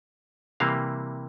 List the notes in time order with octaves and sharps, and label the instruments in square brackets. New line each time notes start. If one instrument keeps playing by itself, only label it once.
[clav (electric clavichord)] C3 E3 G3 A#3 F5